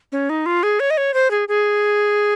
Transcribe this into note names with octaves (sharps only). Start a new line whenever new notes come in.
C#4
D#4
F4
G#4
C#5
D#5
C#5
C5
G#4
G#4